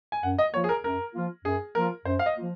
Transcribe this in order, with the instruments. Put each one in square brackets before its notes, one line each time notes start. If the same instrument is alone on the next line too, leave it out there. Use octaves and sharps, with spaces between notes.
[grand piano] G#5
[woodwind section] F#2 [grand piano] F#5
[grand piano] D#5
[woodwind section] F3 A#3 F4 [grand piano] C#5
[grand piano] G#4
A#4
[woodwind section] F#2 [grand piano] A#4
[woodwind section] F3 A#3 F4
[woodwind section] F#2 [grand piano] G#4
[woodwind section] F3 A#3 F4 [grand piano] A#4
[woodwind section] F#2 [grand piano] C5
[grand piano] F5
D#5
[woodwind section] F3 A#3 F4